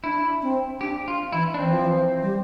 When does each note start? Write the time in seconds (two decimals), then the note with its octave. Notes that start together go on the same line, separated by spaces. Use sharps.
0.04 D4 E4
0.42 C4
0.81 D4 G4
1.08 F4
1.33 E3 E4
1.54 D4
1.59 E3 C4
1.72 F3
1.85 E3
2.22 G3